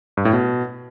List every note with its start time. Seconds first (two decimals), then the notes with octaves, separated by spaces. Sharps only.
0.17 G2
0.25 A2
0.33 B2